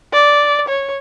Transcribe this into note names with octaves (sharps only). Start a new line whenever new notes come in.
D5
C#5